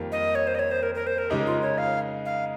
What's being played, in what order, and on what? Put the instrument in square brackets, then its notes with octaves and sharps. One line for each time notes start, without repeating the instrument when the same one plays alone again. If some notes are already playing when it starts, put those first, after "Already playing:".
Already playing: [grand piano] F2 D#3 G3 A#3 F4
[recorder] D#5
C#5
C5
D#5
C#5
C5
A#4
A#4
C5
A#4
[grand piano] C#3 G#3 D#4 A#4 [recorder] G4
[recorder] F4
C#5
F5
F5